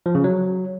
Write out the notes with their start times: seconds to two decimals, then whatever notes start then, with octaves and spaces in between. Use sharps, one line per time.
0.06 F3
0.15 C#3
0.24 F#3